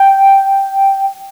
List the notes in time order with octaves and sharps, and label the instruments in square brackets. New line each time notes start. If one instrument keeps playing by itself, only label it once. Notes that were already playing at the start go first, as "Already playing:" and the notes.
Already playing: [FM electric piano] G5